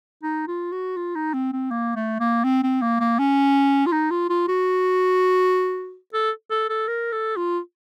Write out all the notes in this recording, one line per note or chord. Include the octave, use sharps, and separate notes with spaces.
D#4
F4
F#4
F4
D#4
C4
C4
A#3
A3
A#3
C4
C4
A#3
A#3
C#4
F4
D#4
F4
F4
F#4
A4
A4
A4
A#4
A4
F4